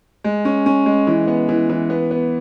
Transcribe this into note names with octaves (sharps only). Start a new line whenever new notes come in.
G#3
C#4
C#4
G#3
E3
B3
E3
E3
B3
B3